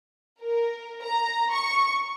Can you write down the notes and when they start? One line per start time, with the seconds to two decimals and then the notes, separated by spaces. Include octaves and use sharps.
0.42 A#4
1.05 A#5
1.53 C#6